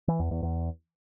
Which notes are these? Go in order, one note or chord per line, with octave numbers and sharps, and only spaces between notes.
E3
E2
E2
E2